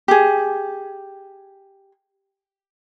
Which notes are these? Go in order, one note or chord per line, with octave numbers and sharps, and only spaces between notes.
G4 G#4